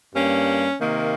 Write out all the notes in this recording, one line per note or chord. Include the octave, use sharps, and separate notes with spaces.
G2 G3 A#3 C#4
C3 D#3 A#3